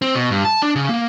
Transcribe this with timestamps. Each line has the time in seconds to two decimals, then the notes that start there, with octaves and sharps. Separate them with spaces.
0.02 C4
0.15 B2
0.30 G2
0.45 A5
0.62 D4
0.76 C#3
0.89 A#3